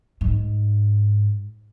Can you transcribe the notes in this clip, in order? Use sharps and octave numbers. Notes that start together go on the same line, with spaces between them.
G#2